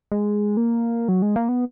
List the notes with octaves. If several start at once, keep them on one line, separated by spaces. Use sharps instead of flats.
G#3
A#3
F#3
G#3
A#3
B3